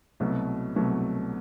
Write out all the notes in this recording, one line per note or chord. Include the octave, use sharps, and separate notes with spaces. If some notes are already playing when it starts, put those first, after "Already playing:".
C2 B2 F#3 A3
C2 B2 F#3 A3